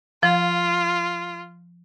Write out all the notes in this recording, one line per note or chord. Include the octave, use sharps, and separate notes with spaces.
F3 F4